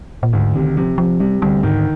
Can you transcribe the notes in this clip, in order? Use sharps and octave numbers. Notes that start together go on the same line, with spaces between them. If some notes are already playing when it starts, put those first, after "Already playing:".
A#2
D2 G#2
C3 D#3
C3 F3
C3 F3
C3 G3
D2 G3
G#2 D#3